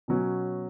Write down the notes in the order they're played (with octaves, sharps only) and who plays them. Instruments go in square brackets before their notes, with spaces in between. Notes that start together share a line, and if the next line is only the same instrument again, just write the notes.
[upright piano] B2 F#3 C#4